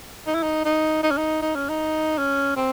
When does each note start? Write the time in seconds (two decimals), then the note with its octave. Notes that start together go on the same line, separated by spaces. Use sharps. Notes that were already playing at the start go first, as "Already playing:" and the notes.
0.27 D#4
0.35 E4
0.43 D#4
0.65 D#4
1.03 D#4
1.11 C#4
1.17 D#4
1.42 D#4
1.55 C#4
1.69 D#4
2.18 C#4
2.56 C4